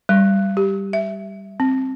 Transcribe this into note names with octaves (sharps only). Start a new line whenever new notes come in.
G3
G4
E5
C4